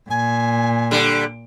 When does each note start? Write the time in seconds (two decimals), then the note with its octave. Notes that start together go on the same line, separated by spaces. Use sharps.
0.10 A#2 G#5
0.91 D3 G3